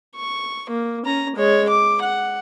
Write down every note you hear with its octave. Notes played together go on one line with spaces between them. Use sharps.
C#6
A#3
C#4 A#5
G#3 C#5
D6
F#5